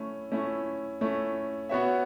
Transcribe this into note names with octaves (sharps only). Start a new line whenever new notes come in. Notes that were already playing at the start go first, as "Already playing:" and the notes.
Already playing: A3 C#4 E4
A3 C#4 E4
A3 C#4 E4
B3 F#4 C#5 E5